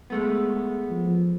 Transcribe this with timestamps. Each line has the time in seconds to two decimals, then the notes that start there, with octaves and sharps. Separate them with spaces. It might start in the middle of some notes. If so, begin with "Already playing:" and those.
0.10 G#3 A3 B3
0.90 F3